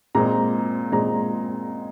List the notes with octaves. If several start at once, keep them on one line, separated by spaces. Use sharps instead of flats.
A#2 G#3 C4 A#5
A#2 G#3 C4 A#5